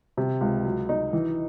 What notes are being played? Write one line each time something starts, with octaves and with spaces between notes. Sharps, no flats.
C3
C#2
F#3
D#4
E3